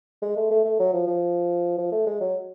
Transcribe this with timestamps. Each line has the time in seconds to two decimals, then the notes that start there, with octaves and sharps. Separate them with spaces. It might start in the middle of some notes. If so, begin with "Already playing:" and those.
0.22 G#3
0.36 A3
0.51 A3
0.64 A3
0.79 F#3
0.93 F3
1.07 F3
1.78 F3
1.92 A3
2.06 G#3
2.20 F#3